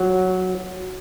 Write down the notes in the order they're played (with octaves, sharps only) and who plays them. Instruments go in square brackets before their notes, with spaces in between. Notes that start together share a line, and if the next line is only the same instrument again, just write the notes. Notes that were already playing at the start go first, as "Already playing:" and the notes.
Already playing: [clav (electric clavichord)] F#3